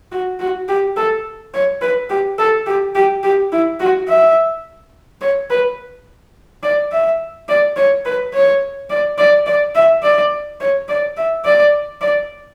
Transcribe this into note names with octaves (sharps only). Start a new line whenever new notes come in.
F#4
F#4
G4
A4
C#5
B4
G4
A4
G4
G4
G4
E4
F#4
E5
C#5
B4
D5
E5
D5
C#5
B4
C#5
D5
D5
D5
E5
D5
C#5
D5
E5
D5
D5